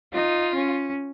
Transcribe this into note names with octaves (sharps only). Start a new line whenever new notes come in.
D#4 F4
C#4